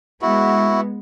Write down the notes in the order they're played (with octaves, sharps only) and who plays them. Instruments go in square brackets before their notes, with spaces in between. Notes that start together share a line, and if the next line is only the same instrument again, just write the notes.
[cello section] G#3 B3 [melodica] E4 F#4